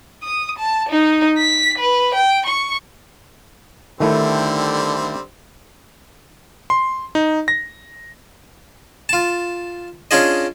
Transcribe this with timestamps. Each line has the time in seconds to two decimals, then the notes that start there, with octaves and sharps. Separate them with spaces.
0.23 D#6
0.58 A5
0.89 D#4
1.38 B6
1.78 B4
2.14 G5
2.46 C#6
4.00 D3 D#3 G3 A3 C4 E4
6.70 C6
7.15 D#4
7.48 A#6
9.09 F4 A5
10.11 C#4 D4 F4 G#4 D#5